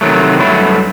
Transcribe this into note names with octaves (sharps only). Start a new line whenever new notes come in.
C3 D#3 F#3 A3
G2 F#3 A3 E4